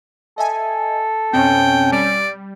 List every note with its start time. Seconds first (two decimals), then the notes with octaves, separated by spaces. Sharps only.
0.38 A4 D#5 E5 G#5
1.33 F2 B2 C4 C#4 G5
1.92 G3 D5